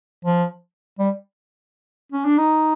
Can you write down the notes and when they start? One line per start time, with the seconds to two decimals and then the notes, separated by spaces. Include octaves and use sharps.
0.25 F3
0.99 G3
2.12 C#4
2.25 D4
2.38 D#4